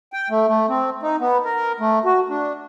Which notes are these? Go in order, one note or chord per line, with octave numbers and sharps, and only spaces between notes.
G5
A3
A3
C4
D#4
B3
A#4
A3
F#4
D4